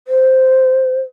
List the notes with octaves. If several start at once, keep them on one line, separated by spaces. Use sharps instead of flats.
C5